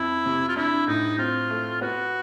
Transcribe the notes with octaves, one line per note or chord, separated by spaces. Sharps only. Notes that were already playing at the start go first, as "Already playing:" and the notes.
Already playing: F2 E4
C3
F4
D4 E4
A2 D#4
C4 F4
A3
B3 F#4